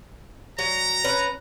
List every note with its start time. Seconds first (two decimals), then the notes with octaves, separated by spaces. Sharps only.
0.59 F#3 A#5
1.04 C#4 B4